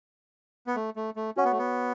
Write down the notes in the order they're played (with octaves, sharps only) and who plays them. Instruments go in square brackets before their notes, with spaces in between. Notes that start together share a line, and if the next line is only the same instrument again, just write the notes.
[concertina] B3
A3
A3
A3
[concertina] C#4 [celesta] F#4 C#5 F#5 C#6
[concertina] B3
A3
B3